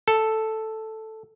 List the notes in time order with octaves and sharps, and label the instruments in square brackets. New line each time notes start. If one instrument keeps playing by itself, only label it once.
[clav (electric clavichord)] A4